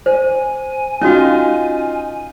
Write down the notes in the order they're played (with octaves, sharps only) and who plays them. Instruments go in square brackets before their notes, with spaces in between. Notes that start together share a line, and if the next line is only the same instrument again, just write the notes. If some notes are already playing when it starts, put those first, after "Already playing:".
[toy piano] C5 [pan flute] G#5
[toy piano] C#4 F#4 [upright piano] D#4 F4